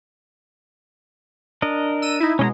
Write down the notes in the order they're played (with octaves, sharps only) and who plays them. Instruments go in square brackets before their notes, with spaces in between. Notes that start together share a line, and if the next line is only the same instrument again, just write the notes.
[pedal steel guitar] D4 A#4 D#5
[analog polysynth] E6 D#7
D#4 E4
[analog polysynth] B2 G#3 [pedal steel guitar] C#4 D#5 A#5